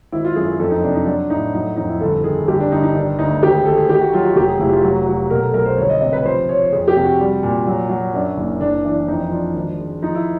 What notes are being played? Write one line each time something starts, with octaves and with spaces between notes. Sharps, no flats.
G#1 E4
F4
F#2 G#4
G#4
F2 A4
D#4
C3 D4
D#4
F#3 D4
A2 D#4
F#3 D#4
F2 D#4
E4
G1 A4
D#3 G#4
G1 G4
D4
G1 D#4
D#4
D#3 D4
D2 D#4
G#1 G4
G#4
G#1 A4
G#4
D#3 G4
F#4
F#3 F4
F#4
F1 G4
G#4
F1 E4
F4
F#3 F#4
F#3 F#4
B2 A#4
A4
B1 A#4
C5
G1 C#5
D#5
C3 D#5
B4
F3 C5
F3 C#5
F2 G#4
G4
C3
F#4
G3
A#2
F#3
F#3
F#2 D4
F#1
F#1 D4
E3 D4
F2 D#4
F3 D4
G#1
G#3
F3 D#4
E4